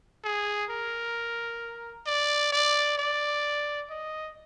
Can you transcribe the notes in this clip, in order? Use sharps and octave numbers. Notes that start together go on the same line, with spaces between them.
G#4
A#4
D5
D5
D5
D#5